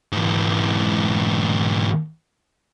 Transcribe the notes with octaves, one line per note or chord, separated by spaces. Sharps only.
G#2 E3